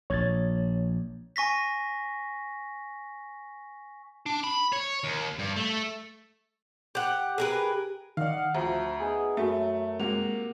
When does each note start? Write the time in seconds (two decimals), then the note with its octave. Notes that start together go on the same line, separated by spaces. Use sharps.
0.10 A#1 C#5 G#6 A6
1.36 G#5 C#6 A#6 B6
4.26 D4
4.44 B5
4.72 C#5
5.04 D#2
5.39 G2
5.56 A3
6.95 G4 F#5
7.38 G4 G#4 A#4 B4
8.17 D#3 D5 D#5 F5 F#5
8.55 D2 F3 E5 A#5
8.99 B3 D#4 G#4
9.37 F#2 A3 F#4 E5
10.00 C3 G#3 A#3 F#4 F7